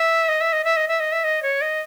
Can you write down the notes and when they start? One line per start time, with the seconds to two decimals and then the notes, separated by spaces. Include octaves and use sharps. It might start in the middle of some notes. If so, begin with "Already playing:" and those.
Already playing: E5
0.29 D#5
0.41 E5
0.53 D#5
0.64 E5
0.77 D#5
0.88 E5
1.00 D#5
1.12 E5
1.24 D#5
1.43 C#5
1.61 D#5